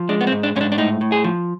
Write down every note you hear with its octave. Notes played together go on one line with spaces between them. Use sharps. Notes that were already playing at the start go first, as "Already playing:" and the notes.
Already playing: F3
G#3 D4
B3
C4
G#2
D4
G#2 C#4
D4
D4
A2 D#4
A2
G#4
F3